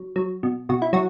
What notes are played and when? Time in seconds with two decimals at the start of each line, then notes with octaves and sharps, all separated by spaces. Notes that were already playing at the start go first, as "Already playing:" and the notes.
Already playing: F#3
0.16 F#3
0.43 B2
0.69 B2 F#4
0.82 E4
0.93 F#3 F#4